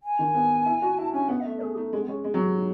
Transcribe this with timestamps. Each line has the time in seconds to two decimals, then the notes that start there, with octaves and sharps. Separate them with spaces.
0.03 G#5
0.19 D#3
0.35 B3
0.66 E4
0.82 F#4
0.97 E4 A5
1.13 C#4 G#5
1.29 B3 F#5
1.41 D#5
1.45 A3 E5
1.60 A3 G#4
1.76 A3 D#4
1.92 G#3 C#4
2.01 B3
2.08 G#3 C#4
2.24 G#3
2.34 F#3
2.51 E4
2.56 D#4